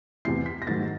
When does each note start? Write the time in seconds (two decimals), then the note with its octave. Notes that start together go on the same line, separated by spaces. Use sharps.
0.25 E2 C3 E3 C7
0.46 B6
0.62 A#6
0.67 G#2 D#3 F#3 A6